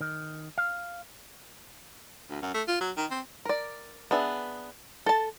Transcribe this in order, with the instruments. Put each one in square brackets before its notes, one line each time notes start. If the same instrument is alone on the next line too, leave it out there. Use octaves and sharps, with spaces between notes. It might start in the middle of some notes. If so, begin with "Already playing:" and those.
[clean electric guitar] D#3
F5
[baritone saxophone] D2
F#2
A3
F4
F#3
D#3
C4
[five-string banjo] A#4 D5
B3 D4 G#4 E5
A4 A5